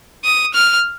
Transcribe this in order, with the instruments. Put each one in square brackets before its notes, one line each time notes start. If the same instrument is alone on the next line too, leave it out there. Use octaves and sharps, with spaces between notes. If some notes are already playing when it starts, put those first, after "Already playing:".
[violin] D#6
F6